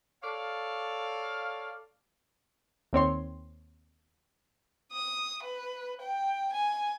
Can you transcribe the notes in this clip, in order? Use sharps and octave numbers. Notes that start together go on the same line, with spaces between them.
A4 C#5 D5 F5
D#2 C4 C#5 C6
D#6
B4
G5
G#5